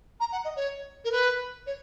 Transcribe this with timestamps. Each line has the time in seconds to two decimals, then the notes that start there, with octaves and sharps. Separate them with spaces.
0.20 A#5
0.32 F#5
0.44 D#5
0.56 C#5
1.04 A#4
1.11 B4
1.66 C#5